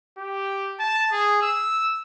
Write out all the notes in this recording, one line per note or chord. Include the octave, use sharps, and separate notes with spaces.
G4
A5
G#4
E6